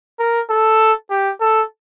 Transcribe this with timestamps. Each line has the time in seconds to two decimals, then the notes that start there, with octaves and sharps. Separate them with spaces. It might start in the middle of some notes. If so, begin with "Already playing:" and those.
0.19 A#4
0.49 A4
1.10 G4
1.41 A4